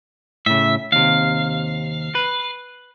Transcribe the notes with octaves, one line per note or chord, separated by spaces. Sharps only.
A2 C#3 E5
D#2 C3 F5
B4